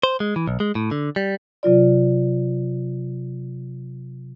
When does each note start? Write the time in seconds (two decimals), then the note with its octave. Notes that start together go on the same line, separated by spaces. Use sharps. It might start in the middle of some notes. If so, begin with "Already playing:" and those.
0.03 C5
0.20 G#3
0.36 E3
0.47 B1
0.60 G#3
0.75 A2
0.91 D3
1.16 G3
1.63 C3 F#3 F4 D5